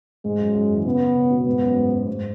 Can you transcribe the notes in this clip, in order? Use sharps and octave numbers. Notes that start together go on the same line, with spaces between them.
G#2 G#3
F#2
F#2
E3
C#3 B3
C#3
B2
G#2 B3
F#2
G#2
F#2
G#2